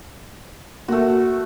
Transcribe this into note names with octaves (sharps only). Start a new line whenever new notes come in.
A3 A#3 F#4